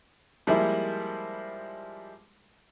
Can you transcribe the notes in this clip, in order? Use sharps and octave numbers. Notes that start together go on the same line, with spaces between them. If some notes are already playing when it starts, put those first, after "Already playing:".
F3 G3 G#3 A#3 E4